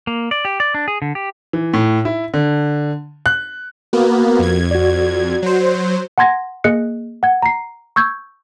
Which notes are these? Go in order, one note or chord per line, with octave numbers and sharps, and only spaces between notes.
A#3
D5
G4
D5
D4
G#4
D3
G4
E3
A2
E4
D3
F#6
A#3 B3 F#4 A#4
F2 G#6
F#4 D5
F#3 C5
F#5 A5 C6 G#6 A#6
A#3 G#4 D#5 F#6 C#7
F#5 G#6
A#5 C7
C#6 E6 G6 G#6